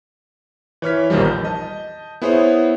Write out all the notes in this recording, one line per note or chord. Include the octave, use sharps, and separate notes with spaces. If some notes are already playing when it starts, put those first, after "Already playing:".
E3 C#5 F6 B6
A#1 E2 D#3 F3 G3
G6
D#5 A5
B3 E4 G#4 C5 C#5